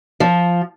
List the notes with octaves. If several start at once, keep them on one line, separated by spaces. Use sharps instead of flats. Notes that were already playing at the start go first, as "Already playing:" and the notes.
F3